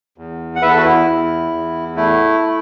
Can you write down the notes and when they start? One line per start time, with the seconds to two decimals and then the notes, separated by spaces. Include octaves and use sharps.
0.18 E2
0.55 F#5
0.62 E2 B4 E5
0.71 A4
0.78 F#4
0.84 E4
1.07 E2
1.51 E2
1.96 A3 E4
2.40 A3